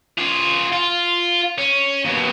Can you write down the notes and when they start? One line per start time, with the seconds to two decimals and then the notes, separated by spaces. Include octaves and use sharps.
0.18 F4 G#4
0.73 F4
1.58 C#4
2.05 D#2 B2